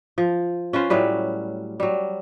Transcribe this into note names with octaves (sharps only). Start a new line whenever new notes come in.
F3
C#4 F4 B4 C5
A2 F#3 G3 B4
F#3 G3